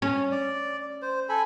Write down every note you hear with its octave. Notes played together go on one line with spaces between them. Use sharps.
C#4
D5
C5
A4 G#5 B5